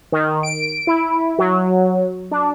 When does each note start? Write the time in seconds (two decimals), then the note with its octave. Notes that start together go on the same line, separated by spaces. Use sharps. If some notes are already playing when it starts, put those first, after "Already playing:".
0.12 D#3
0.43 D7
0.87 E4
1.39 F#3
2.31 D4